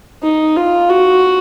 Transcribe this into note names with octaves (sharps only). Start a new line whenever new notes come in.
D#4
F4
F#4